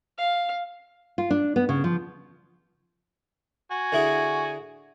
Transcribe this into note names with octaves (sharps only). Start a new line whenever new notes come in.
F5
F4
D4
B3
C#3
F3
F#4 G#5
D3 E4 G#4